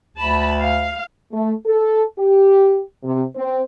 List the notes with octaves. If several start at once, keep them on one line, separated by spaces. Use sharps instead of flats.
D2 A5 B5
F5
A3
A4
G4
C3
C4